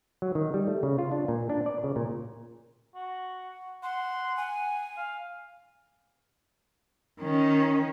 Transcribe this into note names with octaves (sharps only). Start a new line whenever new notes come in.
F#3
D#3
G3
A3
C#3
F4
D4
A#2
D4
D5
C#3
A#2
F#4
F#5 C6
G#5
F5
D#3 C#4